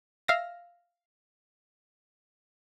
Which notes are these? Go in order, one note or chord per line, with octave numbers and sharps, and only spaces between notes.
E5 F5 A#6